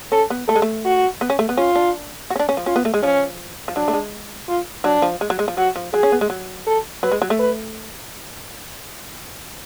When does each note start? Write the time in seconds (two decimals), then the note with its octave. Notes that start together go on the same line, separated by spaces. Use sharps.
0.12 C#4 A4
0.30 B3
0.48 A3 A4
0.56 G#3
0.62 A3
0.85 F#4
1.21 B3
1.30 C#4
1.39 A3
1.49 B3
1.57 C#4 F4
1.75 D4
2.30 F#4
2.36 C#4
2.39 D4
2.49 C#4
2.57 F3
2.66 C#4 F4
2.76 B3
2.85 A3
2.94 G#3
3.02 F3 C#4
3.68 F3
3.76 F#3 D4
3.88 A3
3.93 G#3
4.48 F4
4.84 F#3 D4
5.02 F3
5.21 G#3
5.30 F#3
5.39 G#3
5.48 F3
5.57 F#3 F#4
5.76 F3
5.93 F#3 G#4
6.03 C#4
6.12 B3
6.21 G#3
6.30 F#3
6.67 A4
7.03 F#3 B4
7.12 G#3
7.22 F#3
7.30 A3
7.39 B4